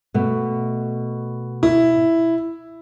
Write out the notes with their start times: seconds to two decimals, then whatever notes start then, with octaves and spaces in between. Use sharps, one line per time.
0.14 B2 A3
1.63 E4